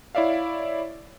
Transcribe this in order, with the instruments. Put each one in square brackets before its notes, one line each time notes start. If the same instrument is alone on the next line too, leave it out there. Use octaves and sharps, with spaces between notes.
[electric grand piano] E4 C#5 D5 E5 F5